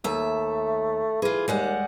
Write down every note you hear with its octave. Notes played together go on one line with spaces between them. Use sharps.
D#2 A3 E5
E3 F4 G#4
D#2 G3 G#3 F#5